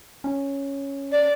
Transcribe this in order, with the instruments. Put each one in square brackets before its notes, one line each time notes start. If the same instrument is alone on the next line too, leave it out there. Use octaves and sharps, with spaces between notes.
[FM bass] C#4
[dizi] D5